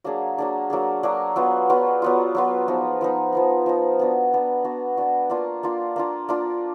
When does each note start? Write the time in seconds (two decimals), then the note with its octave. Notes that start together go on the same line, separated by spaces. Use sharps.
0.04 F#3 A#3 D4 G#4
0.38 F#3 A#3 D4 G#4
0.70 F#3 A#3 D4 G#4
1.03 F#3 A#3 D4 G#4
1.36 F#3 B3 F4
1.69 F#3 B3 F4
2.02 F#3 B3 F4
2.35 F#3 B3 F4
2.68 F3 B3 D#4
3.01 F3 B3 D#4
3.33 F3 B3 D#4
3.66 F3 B3 D#4
3.99 B3 D4 F#4
4.32 B3 D4 F#4
4.64 B3 D4 F#4
4.97 B3 D4 F#4
5.30 A#3 D4 F4
5.63 A#3 D4 F4
5.96 A#3 D4 F4
6.29 A#3 D4 F4